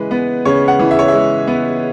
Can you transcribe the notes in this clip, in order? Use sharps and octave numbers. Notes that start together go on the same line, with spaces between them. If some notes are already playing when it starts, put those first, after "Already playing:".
Already playing: C#3 E3 G#3 B4
B3
C#3 C#5
F#5
E3
E5
C#5
G#3 E5
B3